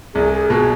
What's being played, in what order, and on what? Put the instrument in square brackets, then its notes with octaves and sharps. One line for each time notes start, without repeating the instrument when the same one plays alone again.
[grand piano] C2 [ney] G#4
[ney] G#4
[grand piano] B2 [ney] G#4